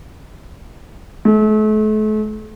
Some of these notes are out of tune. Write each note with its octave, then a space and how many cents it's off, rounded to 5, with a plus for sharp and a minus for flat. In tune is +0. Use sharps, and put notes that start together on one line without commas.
A3 -40